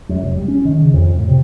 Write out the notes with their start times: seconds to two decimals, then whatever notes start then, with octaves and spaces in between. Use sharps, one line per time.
0.09 F#2
0.22 F1
0.35 G3
0.48 C#4
0.65 D#3
0.82 C#3
0.94 F2
1.16 A2
1.28 C3